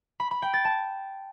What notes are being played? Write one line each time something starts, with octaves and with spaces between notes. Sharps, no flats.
B5
B5
G5
A6
A5